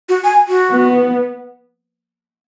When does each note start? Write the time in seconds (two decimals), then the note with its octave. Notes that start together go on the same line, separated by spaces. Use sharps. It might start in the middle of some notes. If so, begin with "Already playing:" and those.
0.09 F#4
0.24 G#5
0.48 F#4
0.71 B3